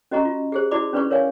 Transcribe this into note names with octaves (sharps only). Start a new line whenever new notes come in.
C#4 F#4 D#5 A#5 C#6
F4
G4 G#4 C5
E4 F#4 D5 B5 D6
C#4 D4 B4 D5 B5 C#6
A#4 C#5 D5 F5 G#5